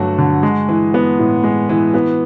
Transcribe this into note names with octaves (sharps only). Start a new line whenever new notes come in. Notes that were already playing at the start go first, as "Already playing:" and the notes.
Already playing: G2 D3 F#3 A3 F#4
D3
G#3
E3
B3
A2
G#3
E3
B3